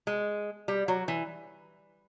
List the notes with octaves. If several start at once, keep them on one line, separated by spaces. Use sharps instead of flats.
G#3
G3
F#3
E3